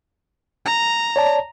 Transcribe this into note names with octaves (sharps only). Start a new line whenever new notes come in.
A#5
C#5 D5 A5